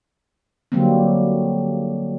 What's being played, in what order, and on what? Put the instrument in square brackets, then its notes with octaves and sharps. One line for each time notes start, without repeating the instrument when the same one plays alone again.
[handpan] D3 F#3 G3 A#3 C4